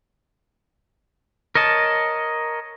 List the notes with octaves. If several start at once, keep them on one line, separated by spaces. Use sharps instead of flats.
A#4 C#5 D#5 A5